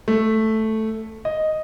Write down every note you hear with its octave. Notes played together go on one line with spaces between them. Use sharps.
A3
D#5